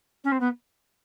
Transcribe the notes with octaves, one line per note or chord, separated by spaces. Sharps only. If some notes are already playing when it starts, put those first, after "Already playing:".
C#4
C4
B3